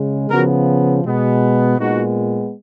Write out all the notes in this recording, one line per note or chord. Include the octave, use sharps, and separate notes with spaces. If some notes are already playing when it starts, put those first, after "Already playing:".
Already playing: C#3 G#3
C#3 F3 B3 F#4 A#4
B2 G#3 B3
A#2 G#3 B3 D#4 F#4